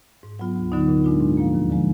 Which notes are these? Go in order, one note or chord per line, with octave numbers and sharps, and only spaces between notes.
G#2
F#3 B3 F4
D2
D3 F#3 B3 D#4
A#2
G#3 D4 F4
G#2
F3 A#3
D#2
D3 F3 G#3